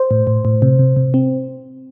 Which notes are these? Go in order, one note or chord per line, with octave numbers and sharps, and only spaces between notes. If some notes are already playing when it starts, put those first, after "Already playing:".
Already playing: C5
A2
A2
A2
C3
C3
C3
C4